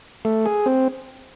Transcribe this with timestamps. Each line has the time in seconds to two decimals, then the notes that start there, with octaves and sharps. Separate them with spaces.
0.25 A3
0.46 G#4
0.66 C4